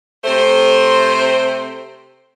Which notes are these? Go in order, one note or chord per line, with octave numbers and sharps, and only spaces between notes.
C3 A3 C5